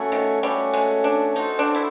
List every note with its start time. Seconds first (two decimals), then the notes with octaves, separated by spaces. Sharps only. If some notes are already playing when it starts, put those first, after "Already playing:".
Already playing: A3 C#4 F#4 A4 C#5
0.12 D#3
0.42 G3 A3 C#4 F#4 A4 C#5
0.73 G#3
1.04 D4
1.35 D#4 F#4 A4 C5
1.59 D4
1.75 E4